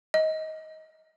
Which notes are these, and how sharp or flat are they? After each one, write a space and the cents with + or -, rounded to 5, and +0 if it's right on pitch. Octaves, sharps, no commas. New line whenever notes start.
D#5 +20